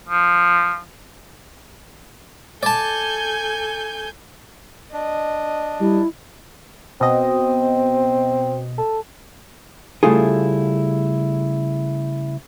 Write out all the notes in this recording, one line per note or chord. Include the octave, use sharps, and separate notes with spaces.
F3
A4 D5 G#5 A5 G6
D4 D#5
G3 E4
B2 C4 D#5
A4
C#3 G3 A3 E4 F4 G#4